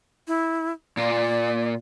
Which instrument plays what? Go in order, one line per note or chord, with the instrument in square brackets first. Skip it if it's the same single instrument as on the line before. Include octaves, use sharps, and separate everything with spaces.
[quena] E4
[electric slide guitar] A#2 F4 [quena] D5